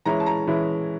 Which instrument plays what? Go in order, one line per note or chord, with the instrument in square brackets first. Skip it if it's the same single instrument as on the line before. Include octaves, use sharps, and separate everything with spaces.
[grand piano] E3 G#3 C#4 E4 A#5
A5
A#5
E3 G#3 C#4 E4